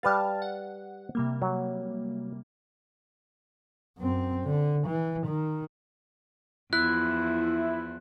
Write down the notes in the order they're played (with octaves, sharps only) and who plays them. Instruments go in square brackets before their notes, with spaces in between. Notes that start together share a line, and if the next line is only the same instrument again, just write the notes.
[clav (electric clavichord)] G3 B4 F5 [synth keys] A5 F6 A6
[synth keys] F#5
C3 G3 A#3
[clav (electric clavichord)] F#3
[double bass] F#2 C4
D3
E3
D#3
[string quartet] E2 F3 [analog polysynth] E4 [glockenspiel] F#6